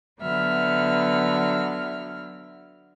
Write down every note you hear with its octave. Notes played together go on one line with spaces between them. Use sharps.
D3 F#3 B3 E5 F6